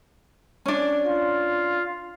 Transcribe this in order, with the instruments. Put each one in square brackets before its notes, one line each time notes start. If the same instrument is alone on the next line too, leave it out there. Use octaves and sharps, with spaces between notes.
[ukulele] C#4 D4
[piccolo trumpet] F4